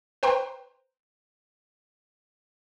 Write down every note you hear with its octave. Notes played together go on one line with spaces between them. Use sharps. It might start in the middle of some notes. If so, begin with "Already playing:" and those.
B4 C5 G5 A#5 C6